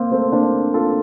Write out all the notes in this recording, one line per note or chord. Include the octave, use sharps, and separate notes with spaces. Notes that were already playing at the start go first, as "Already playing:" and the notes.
Already playing: A#3 C4
A3 C4
A#3 D4
F4 A4